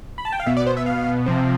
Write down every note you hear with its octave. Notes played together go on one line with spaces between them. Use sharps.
B5
A5
G5
F5
B2 B3 E5
D5
C5
E5
F5
C3 F3 C4